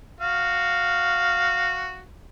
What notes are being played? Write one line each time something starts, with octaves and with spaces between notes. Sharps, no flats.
F#4 F5